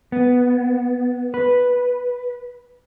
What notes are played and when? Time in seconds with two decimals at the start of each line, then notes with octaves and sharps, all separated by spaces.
0.12 B3
1.34 B4